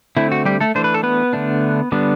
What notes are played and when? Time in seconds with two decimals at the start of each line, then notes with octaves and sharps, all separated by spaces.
0.17 D3 A3 C4 E4
0.32 F#4
0.45 G3 G4
0.60 A3 A4
0.75 E3 A3 D4 C5
0.84 B4
0.94 A4
1.03 B3 B4
1.33 D3 A3 D4
1.92 D3 G3 B3 D4